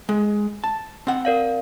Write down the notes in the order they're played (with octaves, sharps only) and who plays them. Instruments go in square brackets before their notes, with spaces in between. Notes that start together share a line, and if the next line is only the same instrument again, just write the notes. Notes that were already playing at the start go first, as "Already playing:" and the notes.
[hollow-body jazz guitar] G#3
A5
C4 F#5
[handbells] A#4 D5 F5